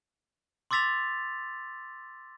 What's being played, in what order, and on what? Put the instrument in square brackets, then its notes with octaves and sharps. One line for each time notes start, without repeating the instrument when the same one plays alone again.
[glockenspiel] C6 D6 E6 A6 B6 F7